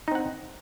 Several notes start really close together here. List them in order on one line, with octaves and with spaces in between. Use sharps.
D#4 C4 F#5